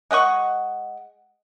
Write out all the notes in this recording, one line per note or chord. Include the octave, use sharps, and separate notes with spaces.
G#3 D#5 F#5 C#6